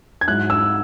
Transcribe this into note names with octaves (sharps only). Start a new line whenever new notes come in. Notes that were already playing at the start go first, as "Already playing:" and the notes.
G#6
G#2 F#3 E4 F#6
E6